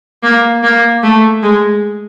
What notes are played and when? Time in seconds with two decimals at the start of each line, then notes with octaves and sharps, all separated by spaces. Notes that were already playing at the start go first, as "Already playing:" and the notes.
0.23 A#3
0.63 A#3
1.03 A3
1.43 G#3